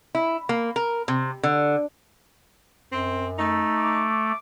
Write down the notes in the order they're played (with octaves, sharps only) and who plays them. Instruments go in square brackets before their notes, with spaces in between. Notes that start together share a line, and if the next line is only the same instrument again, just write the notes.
[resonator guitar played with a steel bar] E4
A#3
A#4
C3
D3
[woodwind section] F#2 [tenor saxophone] C4
[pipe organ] A3 [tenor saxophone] D#4
[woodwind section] D6